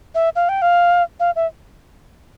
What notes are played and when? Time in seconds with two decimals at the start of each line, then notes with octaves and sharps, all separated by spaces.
0.15 E5
0.36 F5
0.49 G5
0.62 F5
1.20 F5
1.36 E5